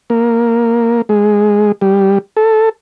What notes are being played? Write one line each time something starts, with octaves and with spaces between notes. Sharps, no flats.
A#3
G#3
G3
A4